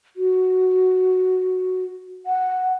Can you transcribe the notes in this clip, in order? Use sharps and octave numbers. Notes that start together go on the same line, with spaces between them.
F#4
F#5